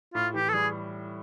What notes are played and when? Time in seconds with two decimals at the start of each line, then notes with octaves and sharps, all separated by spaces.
0.14 A2 F4
0.34 E3 G4
0.49 A4
0.54 G3 G#4